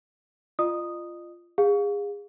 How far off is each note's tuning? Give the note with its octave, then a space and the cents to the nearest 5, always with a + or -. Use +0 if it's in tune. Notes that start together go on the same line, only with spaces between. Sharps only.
F4 -15 D#5 -40 D#6 -5
G#4 -30 F5 +25